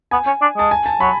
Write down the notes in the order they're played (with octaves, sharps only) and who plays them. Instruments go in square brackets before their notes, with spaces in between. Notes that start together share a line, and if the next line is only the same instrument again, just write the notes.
[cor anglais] B3 [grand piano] G#5
[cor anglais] C#4
D4
[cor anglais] G#3 [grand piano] A5
[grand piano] G#5
A5
[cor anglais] F#3 [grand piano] B5